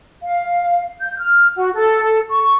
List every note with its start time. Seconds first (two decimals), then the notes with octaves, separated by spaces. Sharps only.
0.22 F5
1.00 G6
1.19 F6
1.56 F#4
1.75 A4
2.30 C#6